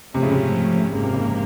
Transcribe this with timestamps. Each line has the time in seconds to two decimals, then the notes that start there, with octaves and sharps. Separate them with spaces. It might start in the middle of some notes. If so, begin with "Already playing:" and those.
0.14 G#2 C3 F3 A3 C#4
0.23 C#3
0.31 C3
0.92 G#1 G#2 C#3 F3 A#3
1.03 C3
1.14 C#3